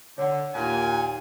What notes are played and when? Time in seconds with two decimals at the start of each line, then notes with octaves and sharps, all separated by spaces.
0.18 D3 C#5 F#5
0.55 D#2 A#2 G#5